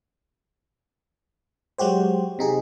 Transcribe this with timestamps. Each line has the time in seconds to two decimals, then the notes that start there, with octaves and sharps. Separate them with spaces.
1.78 F#3 G#3 F#4 G4 C5
2.39 C3 D#4 G#4